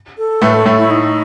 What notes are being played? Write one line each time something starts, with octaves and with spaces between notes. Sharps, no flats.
A4
A2 A3 B4
A4
A2 A3
E4
D#4